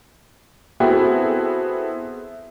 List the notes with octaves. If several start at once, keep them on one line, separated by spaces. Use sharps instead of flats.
B3 C4 E4 F#4 G#4 A4